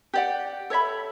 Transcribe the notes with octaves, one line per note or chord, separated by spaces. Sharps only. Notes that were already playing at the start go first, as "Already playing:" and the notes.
G4 D5 F#5
A4 C#5 E5 B5